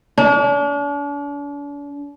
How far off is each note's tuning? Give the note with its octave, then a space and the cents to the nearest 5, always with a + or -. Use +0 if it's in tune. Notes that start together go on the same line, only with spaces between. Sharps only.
D4 -40